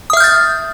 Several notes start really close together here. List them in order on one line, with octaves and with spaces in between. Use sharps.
D#6 E5 F6 G6 A6